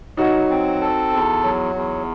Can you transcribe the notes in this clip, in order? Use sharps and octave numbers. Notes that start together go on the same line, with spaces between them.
F#3 D#4 F#4
C4
A4
E2
F#3
E2